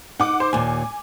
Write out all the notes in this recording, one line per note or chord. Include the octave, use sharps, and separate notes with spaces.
D#4 F#5 D6
C5
D#2 A#2 G#5